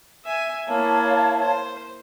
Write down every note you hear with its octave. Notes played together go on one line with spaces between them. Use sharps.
E5 G#5
A#3 E4 C#5 F5 A5
C5